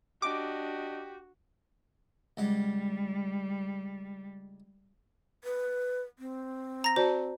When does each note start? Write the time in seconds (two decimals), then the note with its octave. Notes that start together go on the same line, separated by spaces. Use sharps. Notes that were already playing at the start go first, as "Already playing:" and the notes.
0.22 D4 F#4 G4 D#5 D6
2.37 C#2 G3 G#3 F#5
5.44 B4
6.19 C4
6.84 A#5 A#6
6.96 F#4 C5 D5 A5